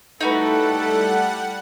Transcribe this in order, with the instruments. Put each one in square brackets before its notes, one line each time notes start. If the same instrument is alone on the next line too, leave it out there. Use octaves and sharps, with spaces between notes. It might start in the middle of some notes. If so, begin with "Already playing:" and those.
[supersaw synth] G3 F#5 [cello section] A3 E4 A4 [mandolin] D#4 F#4 B4